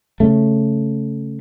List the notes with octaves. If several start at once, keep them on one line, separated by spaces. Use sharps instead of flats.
C#3 A3